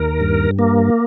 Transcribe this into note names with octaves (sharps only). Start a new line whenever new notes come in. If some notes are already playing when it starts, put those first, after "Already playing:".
Already playing: D#2 A#4
G2
A#3